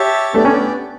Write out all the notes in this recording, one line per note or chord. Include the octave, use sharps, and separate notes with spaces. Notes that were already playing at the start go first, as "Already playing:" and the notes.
Already playing: G4 C#5 E5 A5
A3 B3 D4 G4 D5
C#4